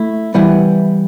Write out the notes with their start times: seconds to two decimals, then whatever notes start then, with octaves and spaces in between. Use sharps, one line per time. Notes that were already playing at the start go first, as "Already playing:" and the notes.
Already playing: A3 E4
0.34 E3 G3 B3 E4